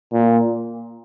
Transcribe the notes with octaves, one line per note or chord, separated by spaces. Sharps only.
A#2